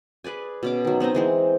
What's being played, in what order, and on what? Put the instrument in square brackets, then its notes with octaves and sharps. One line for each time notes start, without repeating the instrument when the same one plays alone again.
[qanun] G#4 B4 D5 G#5
B2 C#4 D6
D#3 F#3
B3 C4 D#4 D#5
E3 G#3 C4